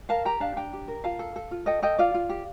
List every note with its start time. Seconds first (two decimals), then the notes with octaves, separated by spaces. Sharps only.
0.09 A#4 F5 A5
0.25 G4 G5 A#5
0.40 D4 F5 A5
0.56 D4 G5 A#5
0.73 G4
0.88 A#4
1.04 F4 F5 A5
1.19 A4
1.36 A4
1.51 F4
1.66 A4 D#5 G5
1.82 A4 D#5 G5
1.98 F4 D5 F5
2.14 F4
2.29 G4